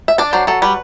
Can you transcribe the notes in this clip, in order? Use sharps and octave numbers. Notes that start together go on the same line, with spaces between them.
E5
D4 D5
F#3 C5
F#3 A4
G3 B4